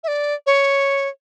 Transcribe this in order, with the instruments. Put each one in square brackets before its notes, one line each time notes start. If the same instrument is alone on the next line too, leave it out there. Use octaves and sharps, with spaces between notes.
[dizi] E5
D5
C#5